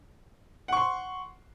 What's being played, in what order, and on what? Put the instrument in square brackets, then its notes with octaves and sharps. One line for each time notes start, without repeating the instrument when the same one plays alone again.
[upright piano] F#5
C#6
C6